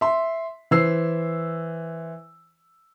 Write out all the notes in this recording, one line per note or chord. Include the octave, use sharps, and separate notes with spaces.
E5 C6
E3 C5 E6 C7